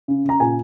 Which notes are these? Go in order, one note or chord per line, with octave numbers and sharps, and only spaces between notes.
C#3
C#3 A#5
A#2 G#5